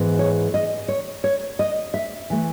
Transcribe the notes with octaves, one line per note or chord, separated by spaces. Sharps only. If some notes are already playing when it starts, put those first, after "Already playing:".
Already playing: G#2 E3 G#3 B3
C#5
D#5
C#5
C#5
D#5
E5
E3 A3